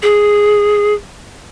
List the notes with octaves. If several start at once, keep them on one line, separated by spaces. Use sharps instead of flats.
G#4